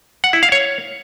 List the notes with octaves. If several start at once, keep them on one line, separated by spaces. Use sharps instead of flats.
F#5
E4
F5
C#5